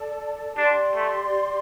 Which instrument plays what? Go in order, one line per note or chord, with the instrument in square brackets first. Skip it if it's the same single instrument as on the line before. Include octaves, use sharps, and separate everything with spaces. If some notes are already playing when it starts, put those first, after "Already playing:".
Already playing: [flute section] A4 D5 A5
[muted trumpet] D4 [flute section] G4 D5 C6
[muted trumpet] A3